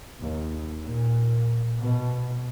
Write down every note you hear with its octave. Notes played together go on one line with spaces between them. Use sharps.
D#2
A#2
B2